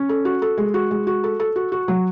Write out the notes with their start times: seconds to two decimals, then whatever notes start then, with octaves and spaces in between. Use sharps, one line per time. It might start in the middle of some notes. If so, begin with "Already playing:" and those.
Already playing: C#4
0.09 A4
0.25 F#4
0.42 A4
0.58 G#3
0.74 F#4
0.91 G#3
1.07 F#4
1.24 A4
1.40 A4
1.56 F#4
1.72 F#4
1.88 F#3